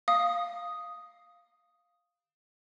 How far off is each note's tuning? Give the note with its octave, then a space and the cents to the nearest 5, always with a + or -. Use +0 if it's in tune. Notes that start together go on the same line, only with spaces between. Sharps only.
F5 +0 D#6 +0